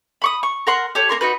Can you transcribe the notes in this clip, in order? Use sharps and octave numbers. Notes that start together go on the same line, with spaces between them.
B5 C#6 D#6
C#6
A#4 F#5 C6
G4 A4 C#5
A#3 F4 A#4 C6
D#4 F#4 B4